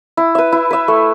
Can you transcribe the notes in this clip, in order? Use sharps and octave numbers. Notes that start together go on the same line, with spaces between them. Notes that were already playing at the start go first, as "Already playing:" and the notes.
E4
B4 E5
E4
B4 E5
A3